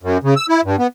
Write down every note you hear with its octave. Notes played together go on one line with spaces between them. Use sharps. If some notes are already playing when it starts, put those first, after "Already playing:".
F#2
C#3
E6
E4
G2
B3